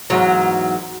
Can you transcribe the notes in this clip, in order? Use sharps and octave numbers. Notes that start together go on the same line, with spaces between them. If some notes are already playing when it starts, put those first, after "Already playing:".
E2 G#2 F#3